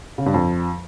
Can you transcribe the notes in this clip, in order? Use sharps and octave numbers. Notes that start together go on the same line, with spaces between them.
C#3
G2
F2